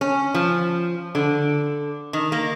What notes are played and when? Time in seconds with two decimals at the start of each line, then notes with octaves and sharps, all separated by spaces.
0.01 C#4
0.35 F3
1.15 D3
2.13 D#3
2.32 A#3